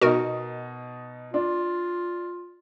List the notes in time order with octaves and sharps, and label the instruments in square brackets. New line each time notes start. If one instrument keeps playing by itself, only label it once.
[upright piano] B2 D#4 [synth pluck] F#4 A#4
[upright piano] D4 [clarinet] F4